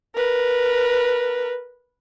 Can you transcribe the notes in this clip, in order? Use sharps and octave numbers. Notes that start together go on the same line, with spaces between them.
A#4 B4